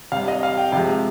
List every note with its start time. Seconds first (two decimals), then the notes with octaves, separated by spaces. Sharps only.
0.12 C3 G3 F5
0.28 D#5
0.43 F5
0.57 G5
0.72 C3 F3 G#3 F5